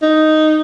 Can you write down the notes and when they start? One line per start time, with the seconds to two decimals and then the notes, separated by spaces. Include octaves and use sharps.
0.02 D#4